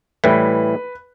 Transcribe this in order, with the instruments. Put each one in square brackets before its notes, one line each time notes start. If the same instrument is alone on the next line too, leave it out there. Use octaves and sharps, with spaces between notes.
[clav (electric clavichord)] A2 E3 G3 [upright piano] B4